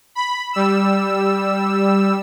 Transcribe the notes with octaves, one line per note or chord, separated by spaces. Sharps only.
B5
G3 E6